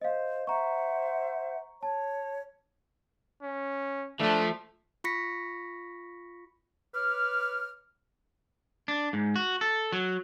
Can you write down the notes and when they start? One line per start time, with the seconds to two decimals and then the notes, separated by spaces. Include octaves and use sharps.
0.01 C5 D#5 F5
0.47 C5 E5 F#5 A#5 C#6
1.83 C#5 A5
3.43 C#4
4.20 E3 F3 A3 D4
5.04 F4 B5 C#6 A#6 B6 C#7
6.94 B4 C#5 D6 F6
8.88 D4
9.13 G#2
9.36 F#4
9.61 A4
9.92 F#3